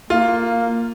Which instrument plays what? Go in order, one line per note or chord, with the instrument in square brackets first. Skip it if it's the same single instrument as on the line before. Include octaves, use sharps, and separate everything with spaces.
[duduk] A#3 [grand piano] F4